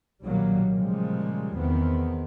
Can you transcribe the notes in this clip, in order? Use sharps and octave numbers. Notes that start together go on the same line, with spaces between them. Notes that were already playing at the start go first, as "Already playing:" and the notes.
B1 A#2 D#3 F#3 G3 A#3
A#2 C#3 F3 G3 G#3
E2 D#3 B3 C4